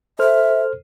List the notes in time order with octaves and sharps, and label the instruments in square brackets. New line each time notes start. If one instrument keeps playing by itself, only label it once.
[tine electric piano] A4 C5 F6 [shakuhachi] E5